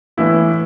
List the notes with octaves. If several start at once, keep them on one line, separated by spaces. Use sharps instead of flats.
A2 E3 B3 E4